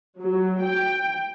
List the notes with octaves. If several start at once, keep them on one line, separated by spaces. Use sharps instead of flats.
F#3
G5